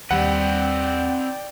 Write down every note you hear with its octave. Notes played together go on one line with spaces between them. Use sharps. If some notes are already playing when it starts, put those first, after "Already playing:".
D#2 G3 C4 B4 D5 F#5 G5